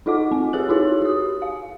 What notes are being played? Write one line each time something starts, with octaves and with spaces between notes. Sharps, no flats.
D#4 F4 A4 D#5 F#5 D6
C4
G4 G#4 C#5 F#6 F#7
D#4 E4 F#4 G#4 C#5
G4 D#6
F5